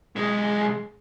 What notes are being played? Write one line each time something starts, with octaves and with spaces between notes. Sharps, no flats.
B1 G#3